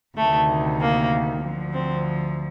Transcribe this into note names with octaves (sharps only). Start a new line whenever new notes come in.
D2 C3 D#3 A3
A#3
D2 D3 F3
C4